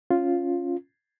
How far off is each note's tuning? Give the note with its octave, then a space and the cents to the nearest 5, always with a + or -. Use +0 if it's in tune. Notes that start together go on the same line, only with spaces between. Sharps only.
C#4 -5 F4 +0